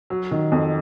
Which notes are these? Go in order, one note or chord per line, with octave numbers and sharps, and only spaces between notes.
F#3
D#3
F2